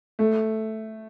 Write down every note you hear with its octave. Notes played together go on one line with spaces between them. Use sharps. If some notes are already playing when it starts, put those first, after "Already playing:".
A3